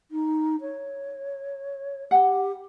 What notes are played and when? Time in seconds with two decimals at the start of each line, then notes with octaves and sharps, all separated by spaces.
0.11 D#4
0.61 C#5
2.11 G4 F#5 G5